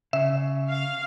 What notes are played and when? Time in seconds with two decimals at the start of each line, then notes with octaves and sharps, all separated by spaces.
0.13 C#3 E5
0.70 F5